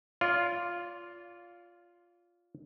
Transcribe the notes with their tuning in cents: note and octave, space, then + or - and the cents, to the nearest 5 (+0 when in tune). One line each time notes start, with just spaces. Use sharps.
F4 +0 D5 -35